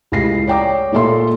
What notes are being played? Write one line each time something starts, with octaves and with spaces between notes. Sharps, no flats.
C#2 A2 G4 A#6 C7
C#5 D5 G5 A#5 D6
A#2 A3 A#3 A4 E5 C6